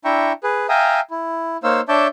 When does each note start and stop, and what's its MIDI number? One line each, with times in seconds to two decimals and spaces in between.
0.05 0.32 62
0.05 0.32 64
0.05 0.32 76
0.05 0.32 79
0.05 0.32 82
0.05 0.32 85
0.44 0.67 68
0.44 0.67 71
0.69 1.00 76
0.69 1.00 77
0.69 1.00 79
0.69 1.00 80
0.69 1.00 82
0.69 1.00 87
1.11 1.57 64
1.64 1.81 58
1.64 1.81 63
1.64 1.81 72
1.64 1.81 73
1.64 1.81 77
1.64 1.81 88
1.89 2.07 62
1.89 2.07 73
1.89 2.07 76
1.89 2.07 81
1.89 2.07 86
1.89 2.07 91